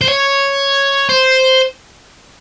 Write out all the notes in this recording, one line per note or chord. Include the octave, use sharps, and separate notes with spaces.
C5
C#5
C5